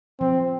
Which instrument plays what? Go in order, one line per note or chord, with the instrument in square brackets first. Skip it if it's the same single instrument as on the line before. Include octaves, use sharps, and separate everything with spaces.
[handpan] F3 [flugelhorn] C4